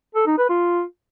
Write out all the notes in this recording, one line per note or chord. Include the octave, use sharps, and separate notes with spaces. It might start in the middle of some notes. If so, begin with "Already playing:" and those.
A4
D#4
B4
F4